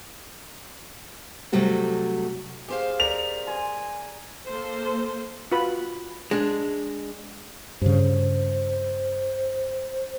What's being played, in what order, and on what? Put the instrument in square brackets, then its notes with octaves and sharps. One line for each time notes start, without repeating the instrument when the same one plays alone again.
[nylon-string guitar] C3 F#3 G3 A3 F#4 A4
[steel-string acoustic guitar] G4 C5 F5 [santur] G#4
[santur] A#4 D5 D#5 [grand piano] F7
[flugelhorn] G#5 [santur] C6
[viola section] A#3 A4 C5
[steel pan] F4 F#4 B4 B5
[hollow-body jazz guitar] G#3 D4
[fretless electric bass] G2 C#3 [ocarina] C5